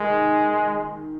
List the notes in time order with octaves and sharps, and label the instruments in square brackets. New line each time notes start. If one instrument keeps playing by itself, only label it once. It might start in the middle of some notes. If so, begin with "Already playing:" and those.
Already playing: [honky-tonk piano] D#3 [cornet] G#3